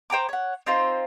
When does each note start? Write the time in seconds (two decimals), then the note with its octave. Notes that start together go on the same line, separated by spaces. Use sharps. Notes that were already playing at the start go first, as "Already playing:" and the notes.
0.10 C5 G5 A#5 D6
0.29 C#5 F#5
0.66 C4 D#4 F4 C5